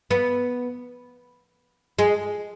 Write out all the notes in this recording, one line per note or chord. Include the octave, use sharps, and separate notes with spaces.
B3
G#3